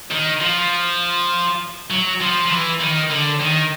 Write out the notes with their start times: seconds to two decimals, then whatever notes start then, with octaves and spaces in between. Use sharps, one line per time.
0.11 D#3
0.41 F3
1.90 F#3
2.21 F3
2.46 F3
2.50 E3
2.80 D#3
3.10 D3
3.40 D#3